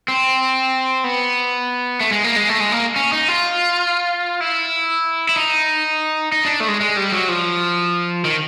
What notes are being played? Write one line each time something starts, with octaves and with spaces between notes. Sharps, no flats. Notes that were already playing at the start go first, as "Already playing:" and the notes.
C4
B3
A3
G#3
A#3
G#3
A3
G#3
A#3
C#4
D#4
F4
E4
E4
D#4
D#4
D4
A3
G#3
G#3
G3
F#3
F3
D#3